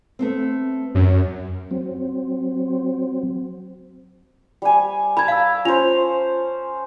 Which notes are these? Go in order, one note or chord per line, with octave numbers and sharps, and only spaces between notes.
A3 B3 C4
F#2
F#3 C4
G3 G#5
A#4 A5 B5 G#6
F5 E6
C#4 F4 C5 F7